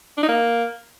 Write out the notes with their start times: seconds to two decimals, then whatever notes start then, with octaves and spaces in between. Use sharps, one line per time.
0.18 D4
0.23 D#4
0.29 A#3